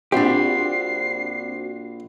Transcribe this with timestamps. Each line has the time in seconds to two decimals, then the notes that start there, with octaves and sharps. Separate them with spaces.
0.12 A#1 C4 D4 F#4 G4 C5 C7